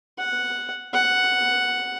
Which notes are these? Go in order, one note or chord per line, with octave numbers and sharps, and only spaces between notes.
F#5
F#5